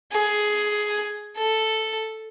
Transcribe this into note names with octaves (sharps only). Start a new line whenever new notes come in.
G#4
A4